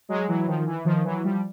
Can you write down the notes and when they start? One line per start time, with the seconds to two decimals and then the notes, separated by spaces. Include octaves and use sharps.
0.09 F#3 G#3
0.28 E3 F#3
0.47 D#3 F3
0.66 E3
0.85 D#3 F3
1.04 E3 F#3
1.24 F3 G3